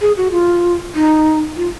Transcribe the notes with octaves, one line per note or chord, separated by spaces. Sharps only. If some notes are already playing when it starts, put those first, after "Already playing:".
G#4
F#4
F4
D#4
F4